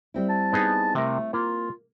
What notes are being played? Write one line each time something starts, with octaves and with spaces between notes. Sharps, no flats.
G3 C4 E4
A5
B3 D#4 G#4
C3 A3 A#4
A#3 F4